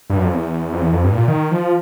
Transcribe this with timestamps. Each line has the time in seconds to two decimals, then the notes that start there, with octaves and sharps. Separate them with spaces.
0.10 G2
0.17 F#2
0.25 F2
0.33 E2
0.73 F2
0.80 E2
0.92 F2
1.04 G2
1.12 A2
1.16 A#2
1.28 D#3
1.51 F3